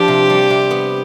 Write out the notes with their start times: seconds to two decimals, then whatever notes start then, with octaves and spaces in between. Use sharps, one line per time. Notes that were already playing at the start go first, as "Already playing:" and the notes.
Already playing: F3 D4 G4
0.08 C3
0.30 G3
0.50 C3
0.71 B3